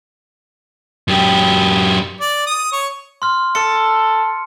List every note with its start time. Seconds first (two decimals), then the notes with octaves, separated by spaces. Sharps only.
1.08 F#2 G4
2.21 D5
2.47 D#6
2.72 C#5
3.22 C6 F6
3.55 A4 C#7